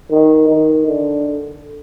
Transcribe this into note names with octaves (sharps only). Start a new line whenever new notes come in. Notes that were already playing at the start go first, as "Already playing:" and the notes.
D#3
D#3
D3